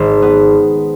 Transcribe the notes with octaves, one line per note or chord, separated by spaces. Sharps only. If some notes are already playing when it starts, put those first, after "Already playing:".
Already playing: G#1
B3